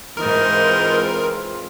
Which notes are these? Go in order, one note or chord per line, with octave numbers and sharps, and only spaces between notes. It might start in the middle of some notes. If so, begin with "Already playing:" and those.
G#2 E3 G#3 C4 D#4 F4 A#4